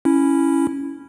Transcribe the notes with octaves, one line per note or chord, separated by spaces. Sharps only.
C#4 E4